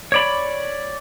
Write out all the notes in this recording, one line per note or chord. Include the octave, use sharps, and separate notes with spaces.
C#5 D5 B5